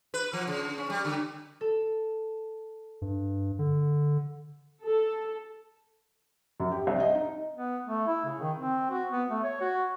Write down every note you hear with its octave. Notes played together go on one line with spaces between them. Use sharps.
B4
F3
C#3
C#4
G3
D3
A4
G2
D3
A4
F#2
G4
C2
D#5
D#4
B3
A3
E4
C#3
D#3
C4
F#4
B3
A3
C#5
F#4